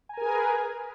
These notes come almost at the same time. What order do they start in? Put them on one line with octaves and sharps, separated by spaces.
G#5 A#5 A#4 G#4 B4